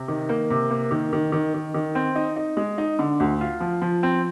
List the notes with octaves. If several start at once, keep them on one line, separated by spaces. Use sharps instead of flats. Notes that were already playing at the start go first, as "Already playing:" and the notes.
Already playing: C3
D#3
A#3
C3
A#3
D#3
D#3
D#3
D#3
D#3
C4
D#4
D#4
G#3
D#4
D3
D2
F4
F3
F3
C4